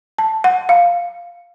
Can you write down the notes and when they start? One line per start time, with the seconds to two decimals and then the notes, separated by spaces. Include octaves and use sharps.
0.18 A5
0.44 F#5
0.69 F5